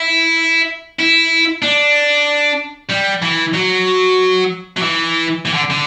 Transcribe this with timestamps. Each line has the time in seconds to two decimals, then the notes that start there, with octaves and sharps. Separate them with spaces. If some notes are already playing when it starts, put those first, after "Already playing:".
Already playing: E4
0.99 E4
1.62 D4
2.90 G3
3.22 E3
3.54 F#3
4.77 F#3
4.82 E3
5.45 E3
5.53 D3
5.70 D3